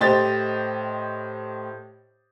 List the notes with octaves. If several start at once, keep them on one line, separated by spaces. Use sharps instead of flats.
A2 G4 C5 D#5 A6